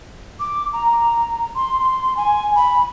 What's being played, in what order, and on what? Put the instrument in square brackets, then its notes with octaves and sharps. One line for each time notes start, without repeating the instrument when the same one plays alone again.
[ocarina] D6
A#5
C6
G#5
B5